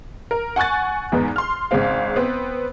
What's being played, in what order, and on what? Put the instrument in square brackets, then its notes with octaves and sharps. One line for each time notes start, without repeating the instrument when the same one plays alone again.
[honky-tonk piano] A#4
F#5 G#5 C#6 F#6 A6
E2 G#2 B3 D#4
C6 F6
G#1 C#3 G#3 C4 F5
B3 C4